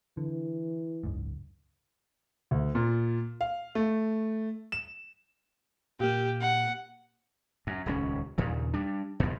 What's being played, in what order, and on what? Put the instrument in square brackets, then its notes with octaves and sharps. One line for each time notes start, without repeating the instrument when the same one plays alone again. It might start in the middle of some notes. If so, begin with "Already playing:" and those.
[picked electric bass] D3 [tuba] E3
[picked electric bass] F#1 C#2 G#2
[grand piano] D2
A#2
F5
A3
E7
[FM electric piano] A#2 A#3 [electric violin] G4
[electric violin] F#5
[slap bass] F#2
D#1 C#2 C#4
D#2 A#2 C#3
G3 D4
E2 G2 B2